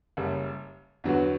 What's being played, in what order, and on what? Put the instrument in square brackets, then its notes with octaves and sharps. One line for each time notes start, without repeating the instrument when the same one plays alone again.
[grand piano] F#1 F#2 C#3 G3
E2 D3 F#3 B3 F#4